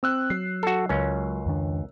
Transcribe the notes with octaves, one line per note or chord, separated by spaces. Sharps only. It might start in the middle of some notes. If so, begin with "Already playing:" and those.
C4 E6 F#6
F#3 C7
F#4 A4
C#2 C#4 A#4
F2 D#3 D4